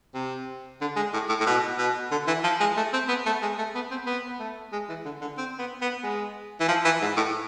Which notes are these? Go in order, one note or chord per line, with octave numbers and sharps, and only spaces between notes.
C3
D3
G#3
A2
A2
A2
B2
B2
D3
E3
F3
G#3
A3
C4
B3
A3
G#3
A3
B3
C4
B3
A3
G#3
E3
D3
D3
C4
B3
B3
G#3
E3
F3
E3
G#2
A2